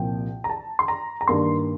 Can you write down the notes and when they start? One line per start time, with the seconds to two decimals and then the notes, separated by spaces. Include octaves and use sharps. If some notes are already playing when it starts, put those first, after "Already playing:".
Already playing: C2 A#2 F3 A#3 G5
0.44 A#5
0.50 A5
0.79 C6
0.88 A#5
1.21 A#5
1.28 G2 D#3 A#3 D4 C6